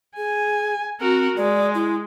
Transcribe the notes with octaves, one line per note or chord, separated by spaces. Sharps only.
G#4 G#5
C4 F#4 A#4
G#3 D5
E4